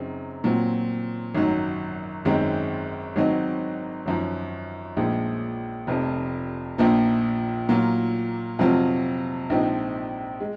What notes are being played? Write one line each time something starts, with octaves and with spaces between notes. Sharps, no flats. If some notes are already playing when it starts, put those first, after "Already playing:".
Already playing: F#2 C#3 F#3 C4 D#4
A#2 F#3 C4
G#1 F#2 D#3 F#3
G#1 F#2 D#3 G#3 C4
G#1 G#2 F#3 C4 D#4
G#1 F#2 F3
A#1 A#2 F3 G#3
F1 F2 C3 F3
A#1 A#2 F3 A#3
A#2 F#3 A#3 F4
F2 C3 F#3 C4 F4
A#1 G#2 F3 C4 D#4
G#3